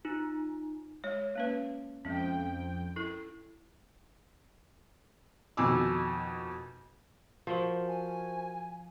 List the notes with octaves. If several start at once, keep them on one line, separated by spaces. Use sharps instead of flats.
D#4 F4
G#3 C#5
A#3 C#4 B4
F2 G#3 C#4 G5
E4 A4
F2 B2 D#3 G#5 D6 E6
F3 F#4 A#4 C5
G#5